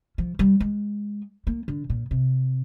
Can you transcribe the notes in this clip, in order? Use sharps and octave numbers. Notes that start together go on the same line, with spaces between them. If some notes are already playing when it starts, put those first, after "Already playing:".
F3
G3
G#3
A#3
D3
A#2
C3